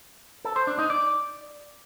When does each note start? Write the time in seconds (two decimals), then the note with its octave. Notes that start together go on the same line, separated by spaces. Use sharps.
0.45 A4
0.56 C5
0.67 D4
0.79 D#4
0.90 D5